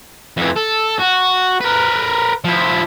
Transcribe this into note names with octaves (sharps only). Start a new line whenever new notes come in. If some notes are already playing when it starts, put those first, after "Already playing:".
F2 E3
A4
F#4
A#4 B4
F3 E4